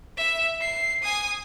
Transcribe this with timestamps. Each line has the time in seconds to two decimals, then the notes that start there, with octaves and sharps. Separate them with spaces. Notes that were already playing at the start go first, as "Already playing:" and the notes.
0.17 E5
0.61 C7
1.03 G#5 D#6